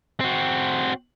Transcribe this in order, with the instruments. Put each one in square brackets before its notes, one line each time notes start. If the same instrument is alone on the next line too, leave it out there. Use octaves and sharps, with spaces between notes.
[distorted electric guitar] C4 F#4